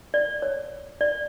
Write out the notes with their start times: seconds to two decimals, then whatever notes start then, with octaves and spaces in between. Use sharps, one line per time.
0.14 D5
0.42 C#5
1.01 D5